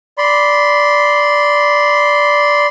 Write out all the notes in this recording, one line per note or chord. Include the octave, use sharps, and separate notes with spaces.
D5 B5 C6